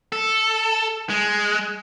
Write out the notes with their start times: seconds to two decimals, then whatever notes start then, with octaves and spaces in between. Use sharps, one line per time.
0.12 A4
1.10 G#3